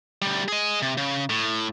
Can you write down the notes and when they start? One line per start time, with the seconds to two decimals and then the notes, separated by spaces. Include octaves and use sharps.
0.22 D2 G3
0.48 G#4 D#5
0.82 C3
0.97 C#3
1.30 A2